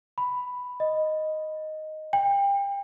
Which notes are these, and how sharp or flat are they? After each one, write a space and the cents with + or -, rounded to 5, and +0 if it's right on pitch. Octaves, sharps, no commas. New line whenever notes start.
B5 +5
D#5 +0
G5 +30